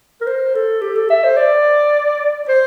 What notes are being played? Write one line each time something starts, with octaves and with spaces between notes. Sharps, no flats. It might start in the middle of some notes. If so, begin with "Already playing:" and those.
A#4
C5
A4
G4
A4
E5
C5
D5
C5